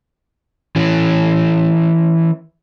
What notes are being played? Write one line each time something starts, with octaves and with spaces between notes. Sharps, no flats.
E3 C#4